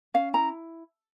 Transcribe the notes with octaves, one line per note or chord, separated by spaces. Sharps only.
C#4 F5
E4 A#5